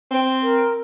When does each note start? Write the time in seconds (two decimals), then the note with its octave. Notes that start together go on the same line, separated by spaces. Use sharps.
0.12 C4
0.43 A#4